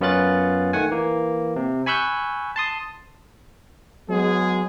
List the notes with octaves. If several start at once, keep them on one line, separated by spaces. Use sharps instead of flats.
F#2 B3 C#4 F4 F#6 A6
D#3 A3 F#5 G#5
E3 A#3
C3
G#5 B5 C#6 E6 F#6 G6
A5 C6 D#6
F#3 G#3 B3 G#4